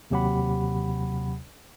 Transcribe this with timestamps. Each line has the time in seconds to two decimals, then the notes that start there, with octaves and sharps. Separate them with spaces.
0.10 D#2 C3 F#3 G4 F#5 B5